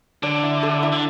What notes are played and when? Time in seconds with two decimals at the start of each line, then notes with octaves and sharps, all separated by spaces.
0.23 D3 D5
0.43 E4
0.63 A4
0.83 E4
0.92 D3